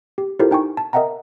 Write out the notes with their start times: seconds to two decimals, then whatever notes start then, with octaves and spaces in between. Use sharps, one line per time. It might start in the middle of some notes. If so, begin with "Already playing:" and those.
0.18 G4
0.40 E4 F4 G4 A4 A#4 C5
0.51 D#4 G5 G#5 C#6
0.77 A5
0.93 A#4 D#5 E5 F#5 G5 A#5